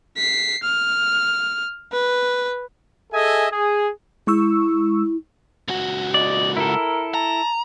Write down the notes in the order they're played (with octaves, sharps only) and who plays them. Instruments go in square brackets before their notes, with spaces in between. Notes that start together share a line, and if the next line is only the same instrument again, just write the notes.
[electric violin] B6 C7
F6
B4
[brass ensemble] G#4 A4 D#5 E5 G#5
G#4
[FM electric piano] G#3 C#6 E6 [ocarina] E4
[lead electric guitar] C#2 F#4
[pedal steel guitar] D5 [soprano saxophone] D#5
[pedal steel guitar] E4 A4 [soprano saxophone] A#4
[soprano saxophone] A5 [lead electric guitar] A#5